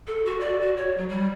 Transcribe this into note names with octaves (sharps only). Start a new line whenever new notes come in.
A4
F#4
D5
F#4
C#5
F#3
G3